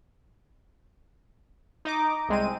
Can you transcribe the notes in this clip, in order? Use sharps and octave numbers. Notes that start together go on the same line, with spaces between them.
D#4 D#5 D6
C2 G#3 C4 D#7